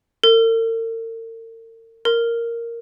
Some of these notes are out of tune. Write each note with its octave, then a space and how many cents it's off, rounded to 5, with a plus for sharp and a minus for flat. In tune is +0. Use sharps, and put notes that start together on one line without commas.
A#4 -45
A#4 -5